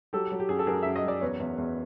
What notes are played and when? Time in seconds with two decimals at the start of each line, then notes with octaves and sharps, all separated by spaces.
0.13 F#3 G4 A4
0.32 F#3
0.40 G4
0.49 F#2 G#4
0.59 A4
0.67 F#2 G#4 A#4
0.82 F#2 E5
0.96 D#5
1.04 F#3 D5
1.21 E2 B4 C#5
1.40 E2
1.58 E2